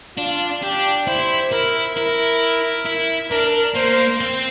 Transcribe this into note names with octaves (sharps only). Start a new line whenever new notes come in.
D4 F4
D4 G4
E4 C5
E4 A#4
E4 A#4
E4
D4 A#4
A#3 C5
C4